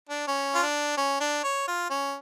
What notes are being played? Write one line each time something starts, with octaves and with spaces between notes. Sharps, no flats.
D4
C#4
F4
D4
C#4
D4
C#5
F4
C#4